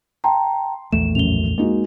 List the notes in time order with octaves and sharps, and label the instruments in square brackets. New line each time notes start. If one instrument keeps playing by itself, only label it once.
[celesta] G5 A5 A#5 [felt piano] C6
[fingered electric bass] A#1 E2 A3 [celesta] E7
[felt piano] A1 F#2 [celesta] F7 G7
[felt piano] G#3 D#4 F#4 [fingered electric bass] A#3